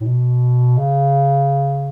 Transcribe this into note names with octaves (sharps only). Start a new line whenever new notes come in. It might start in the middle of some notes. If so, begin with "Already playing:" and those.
A2
B2
C#3